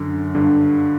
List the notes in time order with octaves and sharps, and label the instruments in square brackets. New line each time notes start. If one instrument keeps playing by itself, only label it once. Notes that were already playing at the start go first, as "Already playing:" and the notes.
Already playing: [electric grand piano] F#2 D3
G2 D3